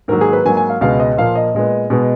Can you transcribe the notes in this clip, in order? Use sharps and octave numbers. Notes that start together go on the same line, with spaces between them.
G#2 D#3 F#3 A#3 A#4
G#4
B4
G#2 F#3 A#3 G#5
G#5
F5
C#2 B2 G#3 B3 F5
D#5
A#2 F3 A#3 F5
D#5
A#2 G#3 B3
B2 G#3 B3